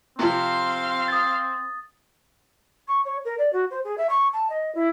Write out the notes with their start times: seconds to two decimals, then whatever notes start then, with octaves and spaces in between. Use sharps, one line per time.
0.19 C3 F3 C4 F5 C6
1.08 D#6 A6
2.88 C#6
3.05 C#5
3.25 A#4
3.38 D5
3.53 F#4
3.71 C5
3.85 G#4
3.98 E5
4.10 C#6
4.33 A5
4.50 D#5
4.75 E4